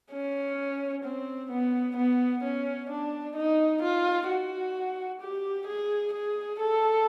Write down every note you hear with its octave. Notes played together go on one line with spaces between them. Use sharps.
C#4
C4
B3
B3
C#4
D4
D#4
F4
F#4
G4
G#4
G#4
A4